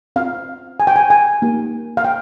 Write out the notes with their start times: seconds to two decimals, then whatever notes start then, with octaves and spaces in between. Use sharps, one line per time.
0.16 C4 F4 F5
0.80 G#5
0.87 G5
0.96 G#5
1.10 G#5
1.42 A#3 D#4 G4
1.97 F5
2.05 G5